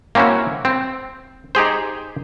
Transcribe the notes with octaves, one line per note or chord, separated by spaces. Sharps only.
A#3 C4 C#4 E4 F#4
C4
D#4 G4 G#4 C5